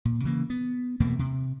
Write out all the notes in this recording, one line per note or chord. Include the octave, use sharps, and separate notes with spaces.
A#2
C#3 E3 A#3
B3
E2 B2 A3 A#3
C3